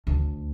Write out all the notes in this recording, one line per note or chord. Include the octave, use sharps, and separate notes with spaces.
D2